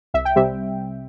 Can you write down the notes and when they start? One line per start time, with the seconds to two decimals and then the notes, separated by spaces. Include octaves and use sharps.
0.14 C2 E5
0.25 G5
0.36 C3 G3 C4 E5